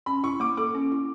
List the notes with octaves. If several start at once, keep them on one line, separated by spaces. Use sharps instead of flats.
C#4 B5
E4 C#6
A#3 D6
A4 D6
C#4
E4